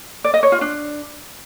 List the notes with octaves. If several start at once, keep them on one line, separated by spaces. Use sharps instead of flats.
D5
D#5
C#5
F4
D4